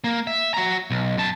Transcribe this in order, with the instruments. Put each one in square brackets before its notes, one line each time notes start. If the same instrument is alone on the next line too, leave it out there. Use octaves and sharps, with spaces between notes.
[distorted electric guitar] A#3
E5
F#4 A#5
B1
F#2 A5